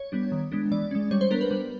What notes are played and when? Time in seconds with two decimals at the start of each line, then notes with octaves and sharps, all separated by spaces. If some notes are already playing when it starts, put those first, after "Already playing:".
Already playing: C#5
0.12 G3 B3 D4
0.32 D#3
0.52 G#3 B3 D4
0.71 E3 D5
0.91 G#3 C#4
1.11 G3 C#5
1.21 C5
1.31 B3 D4 A#4
1.41 B4
1.51 G3